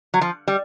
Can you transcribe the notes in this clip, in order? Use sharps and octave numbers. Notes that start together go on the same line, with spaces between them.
F#3
F3
G3